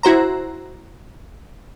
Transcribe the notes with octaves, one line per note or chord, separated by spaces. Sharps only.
E4 F#4 C5 A#5